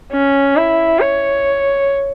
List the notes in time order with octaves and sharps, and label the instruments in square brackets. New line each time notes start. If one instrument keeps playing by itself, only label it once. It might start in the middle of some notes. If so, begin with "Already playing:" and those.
[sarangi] C#4
E4
C#5